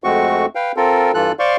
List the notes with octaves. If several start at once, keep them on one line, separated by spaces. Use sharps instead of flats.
F2 G#3 A3 C4 F#4 C#6
B4 F5 G5
C4 F4 A4 A#4
G2 E3 F4 A4 F#6
C5 D5 F5 C6 C#6